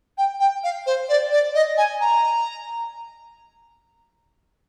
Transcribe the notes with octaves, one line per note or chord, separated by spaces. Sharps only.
G5
G5
F5
C5
D5
D5
D#5
G#5
A#5